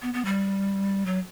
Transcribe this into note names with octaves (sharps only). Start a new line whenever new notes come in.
B3
B3
G3
F#3